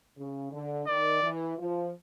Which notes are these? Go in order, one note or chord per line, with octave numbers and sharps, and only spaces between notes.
C#3
D3
D#3 D5
E3
F3